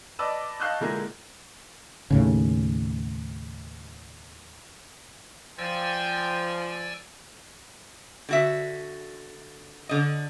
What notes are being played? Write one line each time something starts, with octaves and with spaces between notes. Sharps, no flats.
B4 D5 D#5 A5 D6 E6
D#5 F5 A5 C#6 F#6 G6
A#2 D3 G#3 E4 G#4 A#4
D#2 A2 C#3
F3 D5 G5 G#5 E6
D3 F#4 E5
D3 D#5